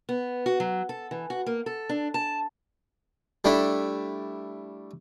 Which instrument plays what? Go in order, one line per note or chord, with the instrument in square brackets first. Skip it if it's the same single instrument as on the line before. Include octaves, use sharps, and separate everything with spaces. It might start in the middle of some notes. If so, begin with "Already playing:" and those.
[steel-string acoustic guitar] B3
F#4
F#3
A4
E3
F#4
A#3
A4
D4
A5
[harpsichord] G3 A3 D4 E4